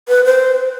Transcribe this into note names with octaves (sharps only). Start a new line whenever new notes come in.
B4
C5